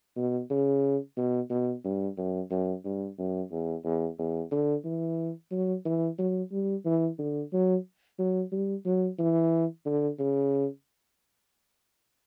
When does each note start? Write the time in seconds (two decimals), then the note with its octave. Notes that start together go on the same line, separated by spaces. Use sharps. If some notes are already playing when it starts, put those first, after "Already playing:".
0.16 B2
0.50 C#3
1.17 B2
1.50 B2
1.84 G2
2.17 F#2
2.51 F#2
2.85 G2
3.18 F#2
3.51 E2
3.84 E2
4.18 E2
4.51 D3
4.85 E3
5.51 F#3
5.85 E3
6.19 F#3
6.52 G3
6.85 E3
7.19 D3
7.53 F#3
8.19 F#3
8.52 G3
8.86 F#3
9.19 E3
9.86 D3
10.19 C#3